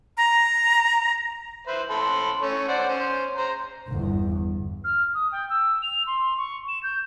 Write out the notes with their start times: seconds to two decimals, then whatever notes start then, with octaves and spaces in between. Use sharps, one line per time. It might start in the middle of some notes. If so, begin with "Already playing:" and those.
0.17 A#5
1.67 B4 C5 E5
1.90 A4 B5 C6
2.42 A3 C#4 C#5
2.68 C5 D5 F#5
2.89 C#4 C5
3.37 C5 A#5
3.88 G1 E2
4.84 F6
5.14 D#6
5.32 G5
5.50 E6
5.83 F7
6.07 C6
6.38 C#6
6.68 E7
6.83 G6